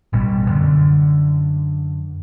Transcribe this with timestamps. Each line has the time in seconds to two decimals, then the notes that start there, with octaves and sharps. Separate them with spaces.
0.13 A1 B2 G3
0.49 F#2 D3